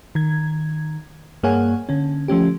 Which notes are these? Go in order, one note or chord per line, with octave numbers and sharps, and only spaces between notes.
D#3 G#6
G2 A#3 G#4 C#5 F#5 G#5
D3 C#4
F3 A3 C#4 G4